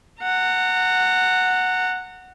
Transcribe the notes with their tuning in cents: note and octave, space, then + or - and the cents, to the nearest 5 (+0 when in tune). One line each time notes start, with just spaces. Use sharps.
F#5 +0 A#5 -35